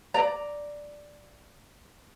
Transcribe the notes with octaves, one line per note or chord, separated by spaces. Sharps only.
D5 A#5